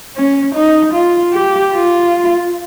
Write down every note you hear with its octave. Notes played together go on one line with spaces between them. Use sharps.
C#4
D#4
F4
G4
F4